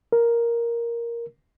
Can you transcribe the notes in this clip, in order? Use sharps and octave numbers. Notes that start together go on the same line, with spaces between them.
A#4